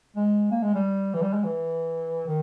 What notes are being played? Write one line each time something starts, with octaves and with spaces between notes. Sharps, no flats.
G#3
A#3
G#3
G3
E3
G3
G#3
E3
D#3